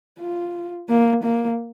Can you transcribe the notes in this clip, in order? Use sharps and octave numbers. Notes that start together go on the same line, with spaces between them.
F4
A#3
A#3